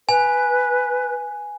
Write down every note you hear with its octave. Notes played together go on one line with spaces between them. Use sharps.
B4 G#5